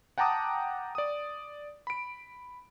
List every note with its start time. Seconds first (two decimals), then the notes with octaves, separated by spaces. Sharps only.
0.18 F#5 G5 A5 A#5 D6 D#6
0.95 D5 D#6
1.87 B5 D7